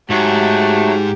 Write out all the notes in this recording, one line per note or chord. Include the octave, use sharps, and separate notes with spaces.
G#2 F#3 A3 G4